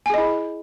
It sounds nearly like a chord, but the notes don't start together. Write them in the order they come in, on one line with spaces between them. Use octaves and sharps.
G#5 G#4 D#5 E4